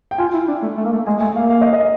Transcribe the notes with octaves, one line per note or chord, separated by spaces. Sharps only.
G5
F4 G#5
E4
D4
A3
A3
A#3
A3
G#3 G#5
A3 G#5
A#3 F5
F5
D#5
D#5